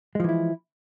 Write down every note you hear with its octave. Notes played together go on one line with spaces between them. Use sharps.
E3 F3 G#3 E4